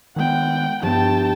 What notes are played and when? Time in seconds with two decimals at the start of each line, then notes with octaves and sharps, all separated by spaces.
0.16 D#3 G#3 B3 F#5 G5
0.83 G2 F3 B3 G5 A5